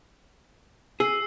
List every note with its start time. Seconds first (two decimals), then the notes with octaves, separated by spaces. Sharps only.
1.00 G#4 E6 C7